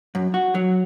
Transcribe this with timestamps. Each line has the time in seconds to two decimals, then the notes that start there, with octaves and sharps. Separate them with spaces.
0.15 F#2
0.34 F#4
0.55 F#3